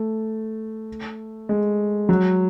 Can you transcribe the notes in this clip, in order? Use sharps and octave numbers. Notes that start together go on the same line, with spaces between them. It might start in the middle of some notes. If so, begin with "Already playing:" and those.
Already playing: A3
G#3
F#3